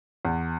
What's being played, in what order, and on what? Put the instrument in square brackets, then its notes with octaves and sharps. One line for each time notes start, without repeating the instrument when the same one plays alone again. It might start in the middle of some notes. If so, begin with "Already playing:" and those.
[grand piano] E2